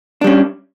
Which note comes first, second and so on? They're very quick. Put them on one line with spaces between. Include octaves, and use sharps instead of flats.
D4 G3 C#4